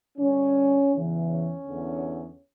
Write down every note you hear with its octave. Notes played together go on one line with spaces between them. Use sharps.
G2 D3 C#4
E2 C#3 E3
C#4
E2 D3